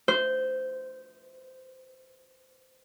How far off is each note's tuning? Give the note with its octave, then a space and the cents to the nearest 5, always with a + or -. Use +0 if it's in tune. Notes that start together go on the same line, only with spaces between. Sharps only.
C5 -15